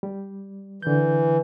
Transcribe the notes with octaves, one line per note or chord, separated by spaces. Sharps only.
G3
D3 E3 G6